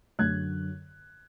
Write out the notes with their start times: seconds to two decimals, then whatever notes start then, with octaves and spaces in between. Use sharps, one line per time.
0.19 F#2 D3 F#3 F#6 G#6